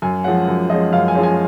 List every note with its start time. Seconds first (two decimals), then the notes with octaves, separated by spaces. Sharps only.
0.02 F#2 G#5
0.24 F3 G#3 C#4 F#5
0.48 F#2
0.70 F3 G#3 C#4 D#5
0.93 F#2 F5
1.08 G#5
1.15 F3 G#3 C#4
1.23 G#5